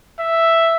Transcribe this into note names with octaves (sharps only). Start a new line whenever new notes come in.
E5